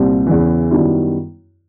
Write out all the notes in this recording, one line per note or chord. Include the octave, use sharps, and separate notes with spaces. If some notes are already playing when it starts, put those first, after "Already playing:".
Already playing: C2 A#2 G3 C4
E2 C#3 E3
F#2 D#3 G3 B3 E4